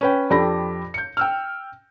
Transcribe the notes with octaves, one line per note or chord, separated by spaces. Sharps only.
C#4 B4 G5
F2 D4 G4 A4 B5 A#6
G6 C#7
G5 E6 F6